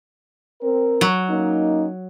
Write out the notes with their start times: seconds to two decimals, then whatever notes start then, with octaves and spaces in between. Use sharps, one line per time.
0.62 C4 A#4
1.01 F#3
1.30 A#3 C#4 D#4